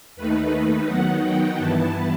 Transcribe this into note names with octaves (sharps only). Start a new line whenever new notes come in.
D#2 D#3 A3 D#4 B4
D#3 F#3 B3 D#4 F#5
G5
G2 E3 B3 E4 A5